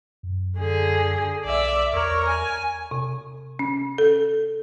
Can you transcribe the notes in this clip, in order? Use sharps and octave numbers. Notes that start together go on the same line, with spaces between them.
F#2
D3 G#4
B1 D5 E5
E2 A#4 C#5
G#5
C3
C#4
A4